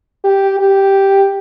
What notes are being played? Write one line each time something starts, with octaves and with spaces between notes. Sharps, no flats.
G4
G4